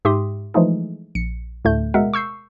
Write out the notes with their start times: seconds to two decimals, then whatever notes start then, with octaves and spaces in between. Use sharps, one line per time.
0.05 G#2 G4 E5 C6 D#6
0.54 E3 F3 G#3 A3 D#4 G#4
1.15 A#1 C#7
1.65 D2 A2 D3 A3 G6
1.94 B2 G#3 A#4 E5 F#5
2.14 C#6 E6 G6 C7